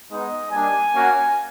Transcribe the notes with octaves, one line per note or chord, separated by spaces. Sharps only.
G#3 B3 D#4 D#5
G3 A#3 D4 G#5
A#3 C#4 F#4